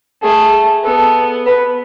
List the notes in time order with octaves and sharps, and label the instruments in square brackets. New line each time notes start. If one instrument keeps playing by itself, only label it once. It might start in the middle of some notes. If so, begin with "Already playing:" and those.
[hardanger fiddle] A3 [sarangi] G#4
[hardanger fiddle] B3 [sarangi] A4
[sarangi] B4